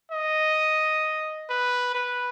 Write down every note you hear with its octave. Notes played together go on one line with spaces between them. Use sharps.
D#5
B4
B4